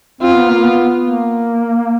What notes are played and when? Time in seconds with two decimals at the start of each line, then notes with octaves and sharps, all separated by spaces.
0.21 C4 F4
0.35 B3
0.50 A#3
0.62 B3
1.02 A#3